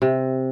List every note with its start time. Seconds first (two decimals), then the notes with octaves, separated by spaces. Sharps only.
0.02 C3